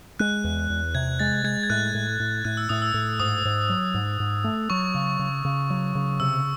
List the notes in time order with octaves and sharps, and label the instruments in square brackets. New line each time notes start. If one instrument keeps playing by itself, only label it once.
[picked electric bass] G#3 [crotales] F#6
[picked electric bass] E2
E2
[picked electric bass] C3 [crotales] G#6
[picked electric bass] G#3 [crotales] A6
[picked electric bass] G#3 [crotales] G#6
[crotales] G#6
[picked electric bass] A2 [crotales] F#6
[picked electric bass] A2
A2
[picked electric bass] A2 [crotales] F#6
[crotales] E6
[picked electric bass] A2 [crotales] D#6
[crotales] E6
[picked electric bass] A2
[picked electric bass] G#2 [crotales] D#6
[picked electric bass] G#2
F#3
G#2
G#2
A3
[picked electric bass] F#3 [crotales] C#6
[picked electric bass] C#3
C#3
C#3
F#3
C#3
[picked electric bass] C3 [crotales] E6